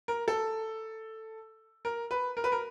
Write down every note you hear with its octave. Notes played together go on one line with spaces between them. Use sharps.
A#4
A4
A#4
B4
A#4
B4
A#4